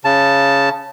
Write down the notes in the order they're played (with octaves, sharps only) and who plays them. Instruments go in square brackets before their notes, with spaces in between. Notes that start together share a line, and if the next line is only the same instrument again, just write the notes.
[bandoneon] C#3 A5